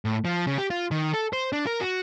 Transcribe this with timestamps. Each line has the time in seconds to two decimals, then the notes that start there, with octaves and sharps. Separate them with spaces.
0.05 A2
0.25 F3
0.47 C#3
0.58 G4
0.70 F4
0.91 D#3
1.14 A4
1.33 C5
1.53 D4
1.67 A#4
1.81 F#4